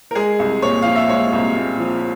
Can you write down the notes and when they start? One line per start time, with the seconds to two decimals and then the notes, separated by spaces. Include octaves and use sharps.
0.11 A#4
0.15 G#3 G#4
0.39 C2
0.62 A#2 C#5
0.82 F3 F5
0.96 E5
1.08 G#3 C#5
1.32 C2
1.56 A#2
1.80 F3